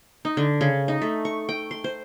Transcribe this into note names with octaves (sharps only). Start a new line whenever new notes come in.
D#4
D3
C#3
D#4
A3
C#6
G5
C6
C5